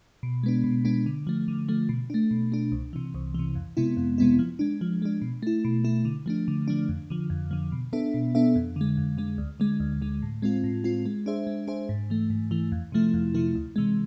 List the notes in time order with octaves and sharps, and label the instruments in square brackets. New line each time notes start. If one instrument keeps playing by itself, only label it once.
[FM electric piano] B2
G#3 B3 D4
B2
G#3 B3 D4
D3
F3 A3
D3
F3 A3
B2
A3 D4
B2
A3 D4
C2
C3 E3
C2
C3 E3
F2
C3 G#3 B3 E4
F2
C3 G#3 B3 E4
F3
G#3 D4
F3
G#3 D4
B2
A3 E4
B2
A3 E4
D3
F3 A3 D4
D3
F3 A3 D4
F2
D3 F3
F2
D3 F3
B2
B3 D4 A4 E5
B2
B3 D4 A4 E5
F2
D3 G#3
F2
D3 G#3
D2
D3 G#3
D2
D3 G#3
A2
G#3 C4 F4
A2
G#3 C4 F4
G#3
D4 G#4 C5 E5
G#3
D4 G#4 C5 E5
G#2
E3 A3
G#2
E3 A3
F2
C3 F3 A3 E4
F2
C3 F3 A3 E4
D2
C3 E3 G#3